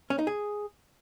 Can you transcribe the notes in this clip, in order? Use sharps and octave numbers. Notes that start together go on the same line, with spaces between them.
C#4
D#4
G#4